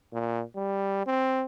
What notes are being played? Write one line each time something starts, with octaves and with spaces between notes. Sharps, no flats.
A#2
G3
C4